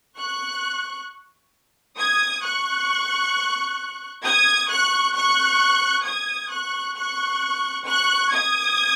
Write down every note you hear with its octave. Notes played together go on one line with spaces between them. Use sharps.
C#6 F#6
D#6 G#6
C#6 F#6
D#6 G#6
C#6 F#6
C#6 F#6
D#6 G#6
C#6 F#6
C#6 F#6
C#6 F#6
D#6 G#6